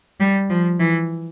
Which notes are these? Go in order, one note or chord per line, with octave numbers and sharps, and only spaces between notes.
G3
F3
E3